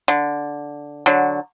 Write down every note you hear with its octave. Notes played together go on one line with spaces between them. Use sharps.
D3
D3 F#3